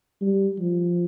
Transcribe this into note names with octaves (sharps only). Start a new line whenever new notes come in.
G3
F3